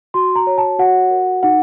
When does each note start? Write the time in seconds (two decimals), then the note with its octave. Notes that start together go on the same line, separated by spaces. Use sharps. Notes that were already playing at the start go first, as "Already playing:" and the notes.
0.14 F#4 C6
0.36 A#5
0.47 C#5
0.58 A5
0.79 F#4 F#5
1.11 A#4
1.43 D#4 F#5